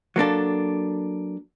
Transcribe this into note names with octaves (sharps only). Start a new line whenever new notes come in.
F#3 A#3 D4 A4